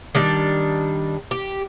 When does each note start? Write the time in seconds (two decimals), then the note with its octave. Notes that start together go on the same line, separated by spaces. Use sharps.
0.15 D#3 G3 D4
1.31 G4